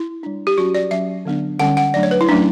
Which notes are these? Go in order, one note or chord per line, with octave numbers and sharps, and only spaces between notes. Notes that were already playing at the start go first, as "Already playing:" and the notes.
Already playing: E4
G3 D4
G4
F#3 C#4 F#4
D5
F#3 C#4 E5
D3 F#3 B3 D4
D3 G3 C#4 F#5
F#5
F#3 A3 D4 D5
C#5
B4
E4
F#3 A3 C#4 D4